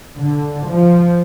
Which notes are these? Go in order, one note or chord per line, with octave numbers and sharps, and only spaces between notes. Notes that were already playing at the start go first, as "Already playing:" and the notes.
D3
F3